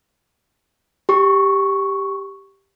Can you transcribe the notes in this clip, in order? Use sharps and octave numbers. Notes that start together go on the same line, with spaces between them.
G4 C#6